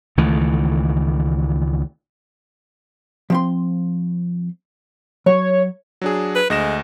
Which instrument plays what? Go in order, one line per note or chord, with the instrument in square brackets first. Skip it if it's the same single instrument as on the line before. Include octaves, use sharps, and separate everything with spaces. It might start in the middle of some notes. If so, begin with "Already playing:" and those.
[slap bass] C#2 D#3 E3 A3
[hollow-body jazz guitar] F3 C4 C6
[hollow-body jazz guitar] F#3 [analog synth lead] C#5
[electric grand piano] F#3 D4 G#4
[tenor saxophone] B4
[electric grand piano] D2 A#6 E7 [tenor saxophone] G#3